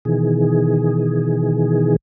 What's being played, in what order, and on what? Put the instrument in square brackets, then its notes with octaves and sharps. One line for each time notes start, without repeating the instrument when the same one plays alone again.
[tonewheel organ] B2 D#3 E3 G#4